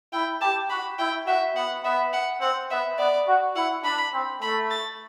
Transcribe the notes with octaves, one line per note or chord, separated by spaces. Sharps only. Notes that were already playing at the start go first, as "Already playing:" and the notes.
E4 G5
G4 A5
F#4 B5
E4 G5
F#4 E5
B3 F#5
B3 E5
F#5
C4 F#5
B3 E5
B3 D5
F#4
E4 F#5
D4 B5
C4
A3 B5
A6